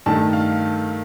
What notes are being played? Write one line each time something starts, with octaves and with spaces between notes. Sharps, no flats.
G2 D#3 A3 D#4 A5
F5